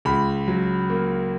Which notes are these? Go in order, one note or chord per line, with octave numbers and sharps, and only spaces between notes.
C#2 B5
F#3
A#3